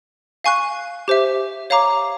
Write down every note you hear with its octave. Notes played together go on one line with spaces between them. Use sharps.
F5 G#5 C#6 F#6
G4 C5 E5
C#5 F5 A#5 D6